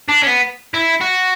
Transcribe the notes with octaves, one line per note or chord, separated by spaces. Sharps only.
D4
C#4
B3
E4
F#4